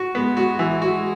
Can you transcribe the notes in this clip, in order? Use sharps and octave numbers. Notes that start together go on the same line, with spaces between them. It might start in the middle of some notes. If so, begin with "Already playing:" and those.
Already playing: F#4
G#3 B3
F#4
E3
F#4